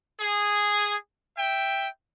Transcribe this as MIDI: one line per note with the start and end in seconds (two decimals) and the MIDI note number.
0.19 0.95 68
1.37 1.86 76
1.37 1.86 79